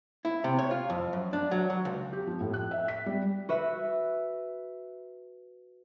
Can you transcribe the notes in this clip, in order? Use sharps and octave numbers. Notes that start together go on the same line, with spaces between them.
E4
C3
C#5
F4
F2
F#2
D4
F#3
F#3
C#2
G4
F3
A2
F#6
E5
B6
G3
F#4 B4 E5